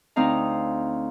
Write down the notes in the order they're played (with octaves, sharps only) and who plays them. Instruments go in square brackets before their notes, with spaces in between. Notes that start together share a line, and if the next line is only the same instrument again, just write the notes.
[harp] D2 C4 D#4 F5 A#5